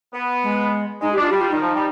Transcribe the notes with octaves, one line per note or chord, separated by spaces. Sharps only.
B3
G#3
G#3 D#4
G4
D4 F4
G3 G4
F4
D#3 D#4
F3
G3